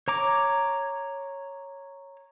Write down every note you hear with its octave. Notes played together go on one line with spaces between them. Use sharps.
C#5 A#5 D6